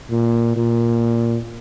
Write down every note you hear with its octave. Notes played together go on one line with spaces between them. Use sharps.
A#2
A#2